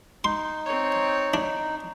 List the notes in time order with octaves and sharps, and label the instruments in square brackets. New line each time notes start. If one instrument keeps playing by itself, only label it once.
[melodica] D#4 [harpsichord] C6
[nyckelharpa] C4 C#5
[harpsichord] D4